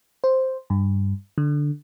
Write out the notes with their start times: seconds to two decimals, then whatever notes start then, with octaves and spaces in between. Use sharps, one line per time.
0.24 C5
0.70 G2
1.38 D3